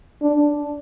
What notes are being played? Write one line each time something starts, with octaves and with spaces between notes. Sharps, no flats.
D4